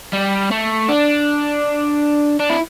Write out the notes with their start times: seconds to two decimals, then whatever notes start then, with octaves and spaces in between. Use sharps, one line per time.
0.13 G3
0.51 A3
0.89 D4
2.40 D4
2.50 E4